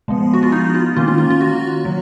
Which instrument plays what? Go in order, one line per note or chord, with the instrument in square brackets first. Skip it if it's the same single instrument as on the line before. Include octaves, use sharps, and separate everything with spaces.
[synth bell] F3 G#3 B3
F#4
F4
D#4
F4
D#3 A#3 C#4 F4
F4
F4
F4
F#4
F#3